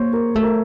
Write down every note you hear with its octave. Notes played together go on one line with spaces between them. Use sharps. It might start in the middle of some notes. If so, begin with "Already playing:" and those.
Already playing: A#3 C5 C#5
A#4
A3 A4
A#4